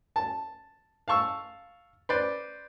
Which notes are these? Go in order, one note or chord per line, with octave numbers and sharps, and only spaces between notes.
A5
F5 A5 C#6 E6
B4 C5 D5